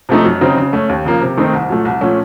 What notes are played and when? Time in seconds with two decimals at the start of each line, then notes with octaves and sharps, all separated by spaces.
0.09 C3 F3 A3 D#4
0.25 F#2
0.41 C#3 F#3 C4 D#4
0.57 C#3
0.73 A3 C#4
0.89 D#2
1.05 C#3 F3 A#3
1.21 C3
1.37 D#3 A3 C4 D#4
1.53 C2
1.69 A#2 F#3 A3
1.85 C2
2.01 A#2 F3 A3 C#4